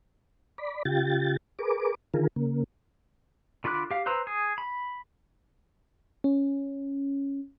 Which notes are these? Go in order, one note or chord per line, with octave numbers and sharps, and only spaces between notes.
D5 B5
C#3 F4 G4 G5 A6
G#4 A#4 B4 D6
D3 D#3 F4 G#4 A#4
C#3 A#3
D3 F4 B5 D6 F#6
G4 F5
B4 C5 A#5 E6
G#4
B5
C#4